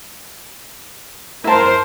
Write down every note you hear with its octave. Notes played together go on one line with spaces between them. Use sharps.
E4 A#4 C5 A5